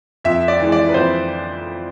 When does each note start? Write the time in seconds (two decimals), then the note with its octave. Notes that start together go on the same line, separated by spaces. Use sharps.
0.25 F2 E5
0.48 D5
0.60 E3 G#3
0.72 D5
0.89 B4
0.94 F2 C5